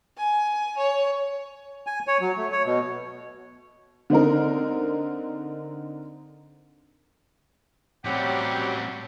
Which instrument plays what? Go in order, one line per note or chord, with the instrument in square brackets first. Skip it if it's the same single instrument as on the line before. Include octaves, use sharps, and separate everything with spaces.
[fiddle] G#5
C#5
[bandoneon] G#5
C#5
F#3
A3
C#5
B2
[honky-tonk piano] D3 C4 D#4 A#4
[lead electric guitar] A2 C#4 [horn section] F#3 F#5 [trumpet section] G3 C4 [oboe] G4